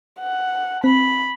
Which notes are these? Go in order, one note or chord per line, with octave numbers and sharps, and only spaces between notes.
F#5
C4 B5